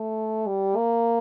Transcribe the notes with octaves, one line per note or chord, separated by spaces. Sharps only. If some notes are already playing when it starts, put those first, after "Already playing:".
Already playing: A3
G3
A#3